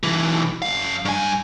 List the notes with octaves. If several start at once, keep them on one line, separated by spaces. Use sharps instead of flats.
B1 E3
F#2 F5
G2 G#5